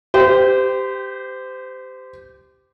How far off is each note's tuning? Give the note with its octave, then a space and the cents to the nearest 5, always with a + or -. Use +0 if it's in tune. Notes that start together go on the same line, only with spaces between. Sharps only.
G4 +0 C5 -30